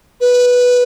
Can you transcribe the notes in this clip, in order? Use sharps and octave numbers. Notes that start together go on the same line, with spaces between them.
B4